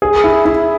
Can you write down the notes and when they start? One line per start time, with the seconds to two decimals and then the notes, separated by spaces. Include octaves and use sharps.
0.02 G#4
0.24 E4
0.45 E4